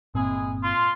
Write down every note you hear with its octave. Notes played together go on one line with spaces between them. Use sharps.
G1 A#2 G#3 C4 E4 G#4
F4 C6